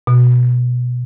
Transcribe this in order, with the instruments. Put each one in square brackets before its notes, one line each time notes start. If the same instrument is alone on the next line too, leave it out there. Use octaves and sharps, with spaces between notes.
[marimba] B2